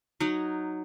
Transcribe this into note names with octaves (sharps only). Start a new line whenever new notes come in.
F#3 D#4